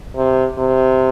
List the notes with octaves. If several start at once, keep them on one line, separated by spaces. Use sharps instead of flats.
C3
C3